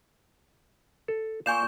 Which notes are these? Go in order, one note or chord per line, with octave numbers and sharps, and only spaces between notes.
A4
A#2 C#5 F5 G#5 G6 E7